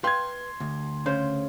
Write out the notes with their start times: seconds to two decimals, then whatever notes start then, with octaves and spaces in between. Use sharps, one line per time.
0.04 B4 F5 G5 C6 G#6
0.60 D2
1.06 C#3 C5